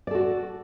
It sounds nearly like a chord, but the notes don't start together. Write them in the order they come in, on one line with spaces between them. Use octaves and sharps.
D5 A4 F#4